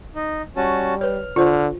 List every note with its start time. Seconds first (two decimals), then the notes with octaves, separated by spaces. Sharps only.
0.15 D#4
0.57 G3 C#4 F#4 A5
1.01 B4 C#5 F6
1.36 D3 F4 C5